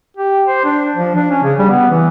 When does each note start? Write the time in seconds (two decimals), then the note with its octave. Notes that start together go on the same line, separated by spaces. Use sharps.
0.17 G4
0.46 C5
0.64 D4
0.96 F3
1.16 D4
1.31 C#4
1.43 C#3
1.59 G3
1.70 B3
1.90 E3